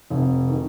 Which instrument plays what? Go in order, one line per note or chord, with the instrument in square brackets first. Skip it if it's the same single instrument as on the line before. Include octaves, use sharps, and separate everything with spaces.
[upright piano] F1
D#3